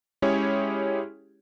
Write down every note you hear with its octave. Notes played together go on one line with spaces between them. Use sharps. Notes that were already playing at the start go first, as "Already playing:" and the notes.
G#3 C#4 E4 G4 G#4 C#5